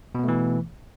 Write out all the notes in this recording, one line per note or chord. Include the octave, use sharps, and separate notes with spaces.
B2 E3 A3 B3